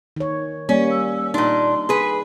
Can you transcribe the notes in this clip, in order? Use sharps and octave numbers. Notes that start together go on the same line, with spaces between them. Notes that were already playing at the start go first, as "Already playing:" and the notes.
D#3 C#5
G3 A#3 C#4 D5
E6
A#2 D4 D#4 C6
G#4 B4